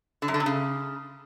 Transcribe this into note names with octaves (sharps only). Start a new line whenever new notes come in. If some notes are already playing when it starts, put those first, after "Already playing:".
D3
F#2
D3
C3
C#3